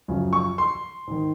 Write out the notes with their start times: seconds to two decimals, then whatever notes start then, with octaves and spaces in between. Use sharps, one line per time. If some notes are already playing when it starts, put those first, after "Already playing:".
0.08 F#2 C#3 F3
0.33 C#6
0.58 C6
1.07 G#2 D#3